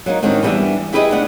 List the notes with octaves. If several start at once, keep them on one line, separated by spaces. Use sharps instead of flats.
F#3 A#3 C4 D#4
A2 D#3 C4 D4 D#4 F#4
E3 F3 G3 B3 D4 E5
E4 G4 G#4 B4 C#5 D#5
D2 B3 D4 F#5